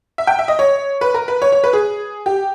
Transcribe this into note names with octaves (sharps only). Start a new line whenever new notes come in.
E5
G5
E5
D#5
C#5
B4
A#4
B4
C#5
C#5
B4
G#4
G4